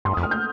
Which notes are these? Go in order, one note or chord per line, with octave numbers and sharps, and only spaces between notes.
G2 C6
D#6
F2
F6
G6